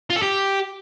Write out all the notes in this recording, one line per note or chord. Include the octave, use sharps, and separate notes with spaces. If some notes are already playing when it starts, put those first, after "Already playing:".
F4
A4
G4